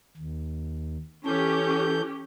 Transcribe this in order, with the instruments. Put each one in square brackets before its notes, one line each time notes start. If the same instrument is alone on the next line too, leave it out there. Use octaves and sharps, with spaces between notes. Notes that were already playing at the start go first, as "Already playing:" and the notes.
[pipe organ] D#2
[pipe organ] E3 A4 G6 [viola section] C#4 G4